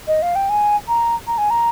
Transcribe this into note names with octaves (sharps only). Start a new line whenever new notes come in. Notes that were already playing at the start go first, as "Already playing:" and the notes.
D#5
F5
G5
G#5
A#5
A#5
G#5
A#5